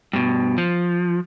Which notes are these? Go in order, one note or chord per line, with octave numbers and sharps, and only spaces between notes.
G2 B2
F3